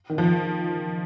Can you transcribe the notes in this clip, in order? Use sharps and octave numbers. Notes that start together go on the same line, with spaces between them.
D#3
F3